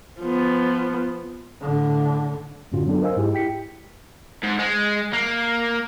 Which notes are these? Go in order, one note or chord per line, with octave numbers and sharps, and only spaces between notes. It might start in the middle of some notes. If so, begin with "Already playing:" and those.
F3 B3
A2 D3
F#2 A2 D3 C#4 F4 F#4
F#3 B3 D4 A4
A#4 C5 D#5 F5 G#5 E6
G#2 E4 G4 G#4
E4 G4 G5 B6 C#7
G#2
G#3
A#3